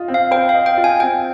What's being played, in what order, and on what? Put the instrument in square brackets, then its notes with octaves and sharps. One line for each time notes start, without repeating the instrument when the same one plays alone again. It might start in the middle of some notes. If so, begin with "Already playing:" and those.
Already playing: [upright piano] F4 D#5
C4
[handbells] F5
[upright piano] C5 [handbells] G5
[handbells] F5
[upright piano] D#5
[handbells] G5
[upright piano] F4
[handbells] G#5
[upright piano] C4 [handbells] G5